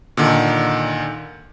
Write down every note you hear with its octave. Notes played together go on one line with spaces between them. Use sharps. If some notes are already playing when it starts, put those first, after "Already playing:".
A#2 D3 D#3